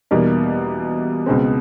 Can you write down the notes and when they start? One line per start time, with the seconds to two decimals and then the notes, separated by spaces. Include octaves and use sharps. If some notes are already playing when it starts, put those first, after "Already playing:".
0.11 E2 B2 G3 A#3 D#4
1.26 C#2 B2 G#3 C4